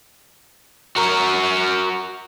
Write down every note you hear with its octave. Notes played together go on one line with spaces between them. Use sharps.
F#4 A#4